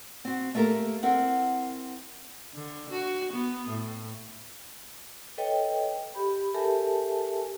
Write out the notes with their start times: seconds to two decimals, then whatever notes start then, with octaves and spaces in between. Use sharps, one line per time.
0.25 C4 F#4
0.55 A3 A#3 G4 A4 A#4
1.03 C4 E4 A#4 F#5
2.54 D3
2.90 F#4
3.33 B3
3.68 A2
5.38 A4 B4 C#5 D#5 G5
6.15 G4 B5
6.54 G4 A4 A#4 E5 G#5 A5